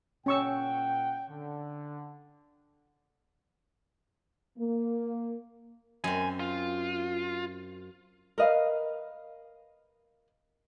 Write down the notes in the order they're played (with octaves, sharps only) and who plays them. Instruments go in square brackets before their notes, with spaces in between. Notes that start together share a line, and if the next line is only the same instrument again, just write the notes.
[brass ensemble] A#2 F#5 G5 [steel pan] C#4 C#6 E6
[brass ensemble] D3
[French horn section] A#3
[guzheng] F#2 C4 [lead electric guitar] G#5
[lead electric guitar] F4
[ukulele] A#4 B4 D#5 F5